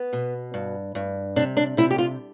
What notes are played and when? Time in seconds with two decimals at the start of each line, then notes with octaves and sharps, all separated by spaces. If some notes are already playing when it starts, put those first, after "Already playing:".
Already playing: B3
0.13 B2
0.54 G2
0.95 G2
1.36 C3 D4
1.57 D4
1.77 C3 E4
1.91 G4
1.98 F4